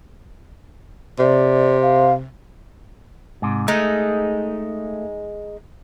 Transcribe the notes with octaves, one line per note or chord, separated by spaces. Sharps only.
C3 D5
F5
G#2 C3
G#3 A3 D#4